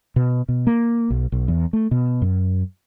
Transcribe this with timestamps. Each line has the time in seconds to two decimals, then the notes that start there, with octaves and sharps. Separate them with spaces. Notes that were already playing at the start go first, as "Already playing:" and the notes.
0.16 B2
0.49 B2
0.67 A#3
1.10 B1
1.32 B1
1.48 E2
1.73 A3
1.91 B2
2.22 F#2